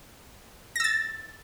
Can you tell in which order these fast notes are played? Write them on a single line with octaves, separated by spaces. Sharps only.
A#6 E6 A6